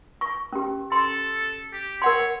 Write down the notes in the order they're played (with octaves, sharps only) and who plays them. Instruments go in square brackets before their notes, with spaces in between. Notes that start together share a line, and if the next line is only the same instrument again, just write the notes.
[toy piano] C#6
C#4 G4
[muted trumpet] A4 [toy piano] C6
[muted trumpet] G4
[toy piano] A#4 F#5 C6 [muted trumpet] C#5